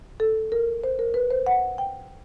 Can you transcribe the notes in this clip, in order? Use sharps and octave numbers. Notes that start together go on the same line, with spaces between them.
A4
A#4
C5
A#4
B4
C5
F#5
G5